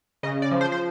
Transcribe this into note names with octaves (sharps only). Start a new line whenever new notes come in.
C#3 D#5
D5
F3
C5
C5